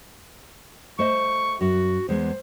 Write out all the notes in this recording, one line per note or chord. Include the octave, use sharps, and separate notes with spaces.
A3 C5 D#5 C#6
F#2 F#4
E2 G#3 B3 C5